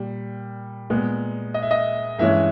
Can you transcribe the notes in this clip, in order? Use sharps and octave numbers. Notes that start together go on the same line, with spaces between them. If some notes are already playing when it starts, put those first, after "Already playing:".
Already playing: A#2 G3
A#2 G#3 B3
D#5
E5
D#5
G2 E3 G#3 C#4 E5